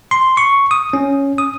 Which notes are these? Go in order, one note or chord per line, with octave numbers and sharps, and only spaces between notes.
C6
C#6
D#6
C#4
D#6